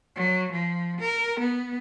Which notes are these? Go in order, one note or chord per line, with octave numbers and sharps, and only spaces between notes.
F#3
F3
A#4
B3